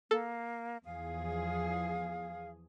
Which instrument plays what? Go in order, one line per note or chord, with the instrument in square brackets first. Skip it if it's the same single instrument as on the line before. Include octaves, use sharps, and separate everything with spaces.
[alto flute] A#3 [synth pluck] A4
[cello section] E2 F3 G#4 [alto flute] F5